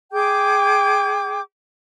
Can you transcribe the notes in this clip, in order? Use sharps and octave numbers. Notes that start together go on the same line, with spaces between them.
G#4 G5 D6 G6